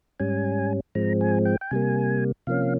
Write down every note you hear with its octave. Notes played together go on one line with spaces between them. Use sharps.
G#2 G3 C#4 G#5
G#2 F3 G#3 C4 A#5
G#5
G5
G5
C3 G3 A#3 G#5
C3 F3 A#3 C#4 F5